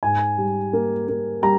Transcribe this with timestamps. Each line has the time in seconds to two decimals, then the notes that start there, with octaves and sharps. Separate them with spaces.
0.03 G#2 G#5
0.38 G3
0.73 A#3
1.08 A#3
1.42 G3 A#5